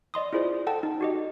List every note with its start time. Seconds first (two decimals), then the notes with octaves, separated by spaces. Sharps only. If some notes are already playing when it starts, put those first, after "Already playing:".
0.14 D5 D#5 C6 D#6
0.33 E4 F4 G#4 C5 D5
0.67 A4 F#5 G5 A5
0.83 D#4
1.01 F#4 G4 D#5